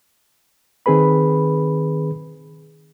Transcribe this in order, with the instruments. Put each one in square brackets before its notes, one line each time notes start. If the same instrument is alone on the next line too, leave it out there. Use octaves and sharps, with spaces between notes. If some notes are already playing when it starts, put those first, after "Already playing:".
[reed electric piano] D#3 C4 G#4 B4 B5